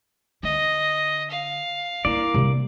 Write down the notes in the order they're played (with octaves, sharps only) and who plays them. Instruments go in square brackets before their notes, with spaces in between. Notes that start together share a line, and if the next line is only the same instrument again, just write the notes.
[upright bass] D3 [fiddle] D#5
[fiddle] F5
[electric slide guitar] A#3 D5 [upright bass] E4
[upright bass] C3 G3